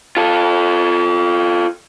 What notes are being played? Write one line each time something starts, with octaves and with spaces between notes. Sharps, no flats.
F4 A4